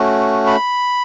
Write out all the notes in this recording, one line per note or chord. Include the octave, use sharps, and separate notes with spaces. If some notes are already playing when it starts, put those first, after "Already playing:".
Already playing: A3 C#4 F#4
B5